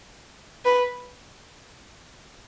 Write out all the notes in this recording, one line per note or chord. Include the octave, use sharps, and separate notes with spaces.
B4